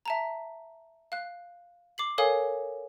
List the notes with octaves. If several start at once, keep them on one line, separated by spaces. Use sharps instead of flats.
E5 A5 A#5
F5 F#6
D6 C7 F#7
A4 A#4 C#5 F5 G#5 D#6